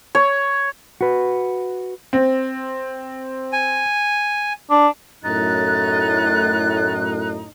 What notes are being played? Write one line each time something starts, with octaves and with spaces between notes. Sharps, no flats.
C#5
F#4 B4
C4
G#5
D4
F#2 A2 D#4 F#6 A6